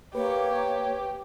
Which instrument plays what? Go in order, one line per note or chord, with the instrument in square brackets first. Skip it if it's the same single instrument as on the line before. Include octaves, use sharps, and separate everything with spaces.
[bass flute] A#3 [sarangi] G4 [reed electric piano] B4 [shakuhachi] C#5